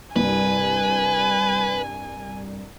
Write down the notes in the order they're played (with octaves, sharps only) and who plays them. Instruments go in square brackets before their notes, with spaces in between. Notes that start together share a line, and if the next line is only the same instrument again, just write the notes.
[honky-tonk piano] C2 G2 [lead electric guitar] B4 [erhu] G#5